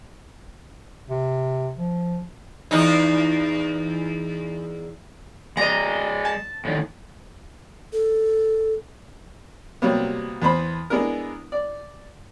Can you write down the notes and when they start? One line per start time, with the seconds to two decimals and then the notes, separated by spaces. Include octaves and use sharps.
1.10 C3
1.77 F3
2.71 E2 D#4
5.57 G#3 D5 D#5 A#5
6.25 A5
6.65 A2 D3 D#3
7.93 A4
9.82 C3 F#3 G3 A#3 B3
10.42 E2 B3 C5 B5
10.90 G#3 B3 D4 E4 A#4
11.52 D5